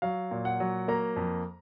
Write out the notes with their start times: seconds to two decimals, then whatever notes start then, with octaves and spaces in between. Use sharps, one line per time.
0.02 F#3 F5
0.31 A#2
0.45 F#5
0.60 F#3
0.88 A#3 A#5
1.16 F2